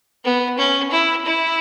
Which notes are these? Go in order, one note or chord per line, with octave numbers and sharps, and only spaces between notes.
B3
C#4
E4
E4